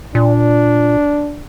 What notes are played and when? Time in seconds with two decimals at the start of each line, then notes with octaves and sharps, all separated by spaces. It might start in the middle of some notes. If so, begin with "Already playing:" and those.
0.15 A#2 D4